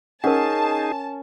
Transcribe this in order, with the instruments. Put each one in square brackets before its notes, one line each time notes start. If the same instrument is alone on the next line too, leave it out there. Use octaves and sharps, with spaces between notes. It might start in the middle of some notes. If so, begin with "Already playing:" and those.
[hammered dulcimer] C#4 [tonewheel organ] D#4 G#4 [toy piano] A#4 F#5 [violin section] A5